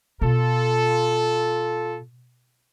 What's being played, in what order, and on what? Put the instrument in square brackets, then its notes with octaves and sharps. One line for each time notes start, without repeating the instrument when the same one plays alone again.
[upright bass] B2 [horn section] F4 A4